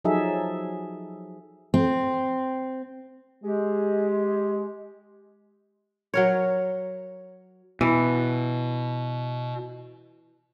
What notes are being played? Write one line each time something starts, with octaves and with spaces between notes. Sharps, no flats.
F3 F#3 D#4 G#4 A4 E5
C4
G#3 G4
F#3 A#4 C#5
B2 E3